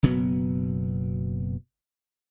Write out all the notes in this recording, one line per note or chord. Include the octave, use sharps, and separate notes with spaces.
F#1 B2 F#3 B3